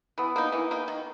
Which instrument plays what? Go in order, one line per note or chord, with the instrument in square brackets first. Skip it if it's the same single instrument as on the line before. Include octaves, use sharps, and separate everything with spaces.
[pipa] E3 [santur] B3 B4
[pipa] A#3 D#4
E3
A#3 D#4
D#3